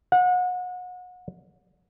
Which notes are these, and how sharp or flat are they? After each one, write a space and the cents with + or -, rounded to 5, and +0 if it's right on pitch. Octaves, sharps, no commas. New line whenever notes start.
F#5 -35